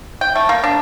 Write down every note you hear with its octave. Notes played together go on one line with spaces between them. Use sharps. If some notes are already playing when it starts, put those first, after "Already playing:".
G5
A3
A#3
D4